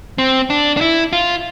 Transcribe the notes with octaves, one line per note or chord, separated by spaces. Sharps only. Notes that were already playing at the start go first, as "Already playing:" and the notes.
C4
D4
D4
E4
F4